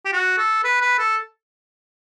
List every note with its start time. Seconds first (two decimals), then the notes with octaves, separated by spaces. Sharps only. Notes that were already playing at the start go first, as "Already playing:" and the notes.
0.05 G4
0.13 F#4
0.38 A4
0.64 B4
0.81 B4
0.98 A4